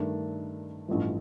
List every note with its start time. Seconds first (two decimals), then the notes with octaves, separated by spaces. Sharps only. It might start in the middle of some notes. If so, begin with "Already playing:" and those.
Already playing: G2 D#3 A3 D4
0.88 A1 G2 F3 A3